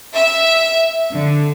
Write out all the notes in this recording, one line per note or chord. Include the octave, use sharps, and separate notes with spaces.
E5
D3